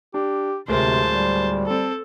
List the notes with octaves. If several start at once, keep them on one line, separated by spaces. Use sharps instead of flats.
D4 G4
D1 C3 G#3 A#4 C5 A5
G3
C4 A4 A5